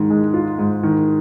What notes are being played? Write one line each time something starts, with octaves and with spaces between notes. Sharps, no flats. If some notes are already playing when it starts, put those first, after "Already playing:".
Already playing: G#2 D#3
G#3
F4
G#2
D#3